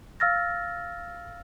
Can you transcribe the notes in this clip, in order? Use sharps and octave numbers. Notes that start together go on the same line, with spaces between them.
F5 E6 F6 A6 A#6